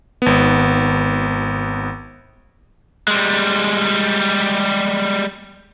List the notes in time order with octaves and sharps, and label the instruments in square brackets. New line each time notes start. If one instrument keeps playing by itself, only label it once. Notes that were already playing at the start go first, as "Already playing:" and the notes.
[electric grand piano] G#1 B3
[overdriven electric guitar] G3 G#3